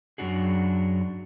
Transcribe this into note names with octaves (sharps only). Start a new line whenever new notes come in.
F#2 F3 F#3 D4 F#4 G#4